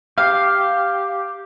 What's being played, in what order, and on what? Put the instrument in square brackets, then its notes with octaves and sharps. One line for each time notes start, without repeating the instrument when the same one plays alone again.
[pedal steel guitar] G4 [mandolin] F5